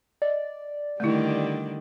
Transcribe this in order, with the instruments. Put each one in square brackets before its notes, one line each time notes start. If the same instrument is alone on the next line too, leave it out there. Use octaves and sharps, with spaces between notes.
[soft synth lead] D5 [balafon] D#5
[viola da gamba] D3 D#3 G3 [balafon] A3 E4